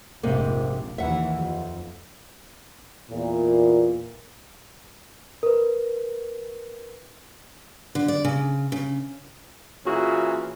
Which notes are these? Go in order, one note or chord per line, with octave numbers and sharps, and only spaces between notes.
F1 A#1 G#2 C3 A#3
D#2 E3 E5 F#5
F2
E2 A#2
A#4 B4
D3
D5
C#3
C#3
A#2 E3 C#4 E4 F#4 G#4